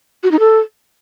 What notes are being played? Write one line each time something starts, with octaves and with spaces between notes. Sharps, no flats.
F#4
D#4
A4